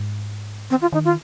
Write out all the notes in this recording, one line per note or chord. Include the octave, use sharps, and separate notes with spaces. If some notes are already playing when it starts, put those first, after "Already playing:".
Already playing: G#2
D#3 C4
F4
D#3 D#4
F4